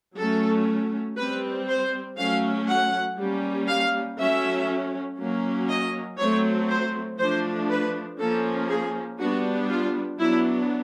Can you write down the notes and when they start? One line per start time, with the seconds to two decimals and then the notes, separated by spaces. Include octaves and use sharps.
0.16 F#3 A3 C#4 A4
1.17 G3 C4 B4
1.68 C5
2.17 F#3 A3 C#4 F5
2.67 F#5
3.18 G3 A#3 C#4
3.68 F5
4.18 F#3 A3 C#4 E5
5.18 F#3 A#3 C#4
5.68 D#5
6.18 F#3 A3 C4 C#5
6.69 C5
7.19 F3 A3 D4 C5
7.69 B4
8.19 F3 A#3 C#4 A4
8.69 G#4
9.19 G3 B3 D4 F#4
9.69 F4
10.19 F#3 B3 D4 E4